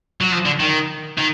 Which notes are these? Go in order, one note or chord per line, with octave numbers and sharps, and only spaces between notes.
F#3
F3
D3
D#3
D#3